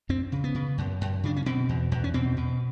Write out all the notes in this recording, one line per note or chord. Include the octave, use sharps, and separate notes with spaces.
F#2 C4
C#3
B3
C#3
F#2
F#2
C#3 D4
C#4
B2 C4
E2
E2
C#4
B2 C4
B2